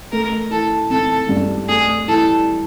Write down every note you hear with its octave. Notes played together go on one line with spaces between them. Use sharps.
A3 A#4
E3 A4
G#1 A4
G2
A3 G#4
E3 A4